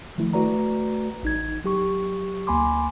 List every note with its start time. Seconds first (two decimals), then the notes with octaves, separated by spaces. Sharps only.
0.18 D#3 F3 A3 E4
0.33 A3 F#4 B4 D5 A#5
1.23 A1 D#4 G#6
1.64 F#3 G4 C#6
2.47 D2 A#3 G#5 B5 C6 D6